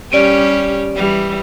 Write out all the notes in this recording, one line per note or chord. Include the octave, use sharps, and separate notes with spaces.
G3 C#4 G4 D5 D7 D#7
E3 G3